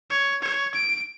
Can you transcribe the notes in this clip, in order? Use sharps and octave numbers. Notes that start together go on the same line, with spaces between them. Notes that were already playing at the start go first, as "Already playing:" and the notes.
C#5
C#5
D7